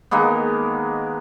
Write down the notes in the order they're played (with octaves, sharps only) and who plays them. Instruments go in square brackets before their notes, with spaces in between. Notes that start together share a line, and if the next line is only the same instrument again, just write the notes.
[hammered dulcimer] D#3 G#3 A#3 B3